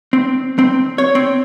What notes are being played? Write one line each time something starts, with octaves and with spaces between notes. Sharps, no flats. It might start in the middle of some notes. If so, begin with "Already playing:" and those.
C4
C4
C#5
C4